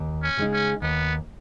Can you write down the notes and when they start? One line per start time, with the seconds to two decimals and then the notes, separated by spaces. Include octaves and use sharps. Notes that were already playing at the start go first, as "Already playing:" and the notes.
Already playing: D#2
0.23 C#4
0.37 C#3 G#3 D#4
0.53 C#4
0.82 D#2 B3